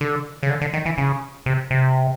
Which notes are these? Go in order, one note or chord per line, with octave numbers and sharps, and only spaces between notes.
D3
C#3
D3
D3
D#3
E3
C#3
C3
C3